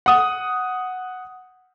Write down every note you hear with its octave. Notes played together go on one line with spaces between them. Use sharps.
F#5 D#6